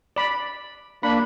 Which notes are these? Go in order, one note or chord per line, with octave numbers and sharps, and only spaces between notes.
D5 B5
A#3 D4 B5